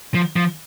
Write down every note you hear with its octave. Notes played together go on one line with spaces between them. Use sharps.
F3
F3